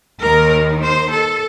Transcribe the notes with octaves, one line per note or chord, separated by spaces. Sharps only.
D#2 D#3 A#4
C5
A4